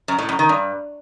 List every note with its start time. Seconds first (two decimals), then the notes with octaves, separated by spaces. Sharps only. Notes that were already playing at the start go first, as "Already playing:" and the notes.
0.08 F#2
0.18 A2
0.29 F#2
0.39 D#3
0.49 G2